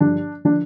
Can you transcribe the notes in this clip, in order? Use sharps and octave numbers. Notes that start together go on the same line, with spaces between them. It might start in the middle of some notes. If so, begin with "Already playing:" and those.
G2 D3 F3 D4
D3 F3 D4